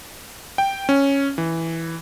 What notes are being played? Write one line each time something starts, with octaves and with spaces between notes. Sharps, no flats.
G5
C#4
E3